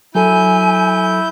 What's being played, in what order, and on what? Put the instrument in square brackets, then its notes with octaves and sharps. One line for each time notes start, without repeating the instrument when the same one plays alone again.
[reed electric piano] F#3 A4 [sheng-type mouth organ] E4 G6 [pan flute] G#5